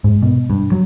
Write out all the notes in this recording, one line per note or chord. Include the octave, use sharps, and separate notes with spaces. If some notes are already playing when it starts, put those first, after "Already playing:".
G#2
B2
G2
F#3